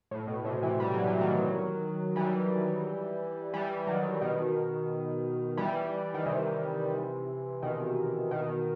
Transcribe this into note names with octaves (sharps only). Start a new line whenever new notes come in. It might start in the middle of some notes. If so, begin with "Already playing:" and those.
A2
B2
A2 C3
C3 E3
G3
F#3
E3
D#3 F#3
E3 G3
E3 G3
D#3 F#3
B2 D#3
E3 G3
D#3
C3 E3
B2 D#3
B2 D#3